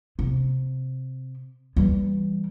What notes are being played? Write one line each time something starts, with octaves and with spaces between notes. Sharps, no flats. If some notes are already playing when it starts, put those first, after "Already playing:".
C3
E3 G3